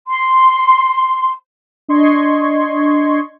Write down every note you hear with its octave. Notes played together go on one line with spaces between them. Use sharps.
C6
D4 D#5 C6 C#6 G#6